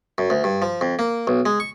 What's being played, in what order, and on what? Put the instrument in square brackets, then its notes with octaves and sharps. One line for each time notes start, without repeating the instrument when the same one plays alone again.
[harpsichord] F#2
D2
G2
F3
F2
A#3
B1
G#3
C#6